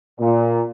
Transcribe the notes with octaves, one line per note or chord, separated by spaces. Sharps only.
A#2